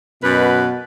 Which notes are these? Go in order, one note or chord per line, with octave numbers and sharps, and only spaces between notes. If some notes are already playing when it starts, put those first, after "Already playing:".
F#2 B2 B4